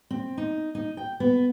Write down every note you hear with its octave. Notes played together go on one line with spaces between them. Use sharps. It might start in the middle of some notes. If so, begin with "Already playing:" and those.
C4
D#4
D#4
G5
B3